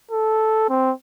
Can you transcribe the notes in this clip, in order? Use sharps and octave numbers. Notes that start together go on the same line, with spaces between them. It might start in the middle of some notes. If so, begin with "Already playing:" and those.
A4
C4